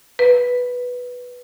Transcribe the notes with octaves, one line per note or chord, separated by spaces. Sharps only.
B4